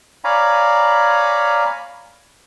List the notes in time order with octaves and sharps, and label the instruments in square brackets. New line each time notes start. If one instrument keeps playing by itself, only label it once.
[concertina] C#5 D5 F5 G#5 A#5 B5